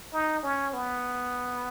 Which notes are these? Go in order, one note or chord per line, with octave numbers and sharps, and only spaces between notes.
D#4
C#4
B3